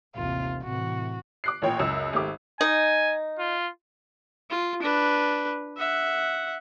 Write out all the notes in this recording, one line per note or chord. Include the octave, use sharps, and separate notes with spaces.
A1 D#2 C3 F4
A2 C3 E3 F#4
D6 F#6 C7
A1 A#2 C#5 G5
C#2 F#2 E6
G#1 A3 G4 D6
D#4 G#5
F4
F4
D4 B4
E5 F#5